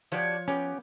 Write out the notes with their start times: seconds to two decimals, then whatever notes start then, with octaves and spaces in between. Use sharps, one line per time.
0.12 F3 D4 F#4 G4 C#5
0.48 B3 C#4 G4